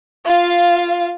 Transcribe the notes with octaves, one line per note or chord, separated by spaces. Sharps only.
F4 F5